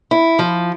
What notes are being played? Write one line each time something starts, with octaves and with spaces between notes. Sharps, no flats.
E4
F3